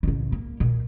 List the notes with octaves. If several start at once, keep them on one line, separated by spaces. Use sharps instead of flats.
A1 C#3
A#3
A#2